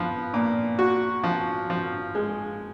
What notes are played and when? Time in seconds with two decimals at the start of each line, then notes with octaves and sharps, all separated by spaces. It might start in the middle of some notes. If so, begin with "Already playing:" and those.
Already playing: F3 B3
0.34 A#2
0.79 F#4
1.24 F3
1.70 F3
2.15 G#3